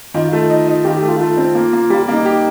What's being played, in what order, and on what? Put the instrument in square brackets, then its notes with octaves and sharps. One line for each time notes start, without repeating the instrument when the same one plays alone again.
[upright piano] D#3 [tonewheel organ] F4
[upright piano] A3 [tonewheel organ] F4
[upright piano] D#4
D#4
[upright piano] D#3 [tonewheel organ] G4
[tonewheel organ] G4
[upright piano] A3
[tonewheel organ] F4
[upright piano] A3 [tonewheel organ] F4
[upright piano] C4
A#3
A#3
[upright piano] G3 [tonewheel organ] G4
[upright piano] A#3
[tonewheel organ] D#4
[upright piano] G4